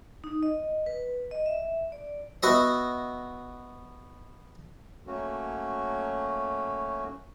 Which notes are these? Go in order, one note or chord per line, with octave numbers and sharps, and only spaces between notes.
D#4
D#5
B4
D#5
E5
D5
B3 F#4 D#5 E5
F#3 A3 A#3 C#4 F#4